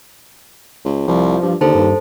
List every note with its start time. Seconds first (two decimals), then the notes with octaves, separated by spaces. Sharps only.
0.85 C#2
1.08 C2 F3
1.43 G2
1.61 D#2 D3 A4 C5 A5
1.75 G2